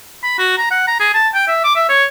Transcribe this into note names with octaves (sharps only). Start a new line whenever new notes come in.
B5
F#4
A#5
F#5
A#5
G#4
A5
G5
E5
D6
E5
C#5